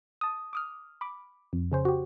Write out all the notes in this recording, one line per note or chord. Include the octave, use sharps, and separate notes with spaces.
A5 D#6
D6 D#6 F6
B5 D6
F2
C#3 C#4 C5
F#4 G4